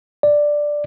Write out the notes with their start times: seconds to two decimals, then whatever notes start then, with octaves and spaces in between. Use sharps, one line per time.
0.23 D5